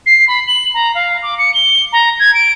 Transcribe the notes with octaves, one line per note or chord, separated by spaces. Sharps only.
C7
B5
F#7
A#5
F5
D6
C#7
G7
A#5
G#6
D7